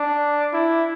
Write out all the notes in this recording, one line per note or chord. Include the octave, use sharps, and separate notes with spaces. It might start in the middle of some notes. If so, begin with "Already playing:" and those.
Already playing: D4
E4